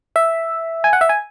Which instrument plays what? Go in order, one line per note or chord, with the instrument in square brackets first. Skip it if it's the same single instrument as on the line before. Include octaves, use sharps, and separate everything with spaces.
[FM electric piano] E5
G#5
F#5
E5
G#5